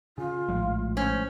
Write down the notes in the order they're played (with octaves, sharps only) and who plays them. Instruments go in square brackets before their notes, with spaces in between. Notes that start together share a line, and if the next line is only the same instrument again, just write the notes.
[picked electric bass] C#3 [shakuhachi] F4
[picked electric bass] A#1 [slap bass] A2 F3 G#3
[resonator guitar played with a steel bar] C#4 [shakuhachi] C5